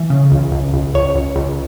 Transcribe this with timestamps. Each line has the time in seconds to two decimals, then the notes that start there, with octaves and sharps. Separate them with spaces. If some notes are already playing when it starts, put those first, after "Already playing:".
Already playing: E3
0.10 C#3
0.32 C#2
0.52 C#2
0.73 C#2
0.94 C#2 C#5
1.15 C#2
1.36 C#2